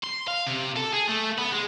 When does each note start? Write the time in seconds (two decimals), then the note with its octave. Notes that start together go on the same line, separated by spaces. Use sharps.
0.04 C6
0.28 F5
0.47 C3
0.77 A4
0.93 G#4
1.09 A3
1.38 B3
1.52 G#3